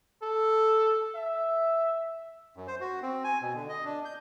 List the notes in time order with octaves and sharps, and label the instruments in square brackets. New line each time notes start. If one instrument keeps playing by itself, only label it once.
[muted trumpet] A4
E5
[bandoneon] F#2
C5
F#4
C4
G#5
B2
D3
D#5
D4
G6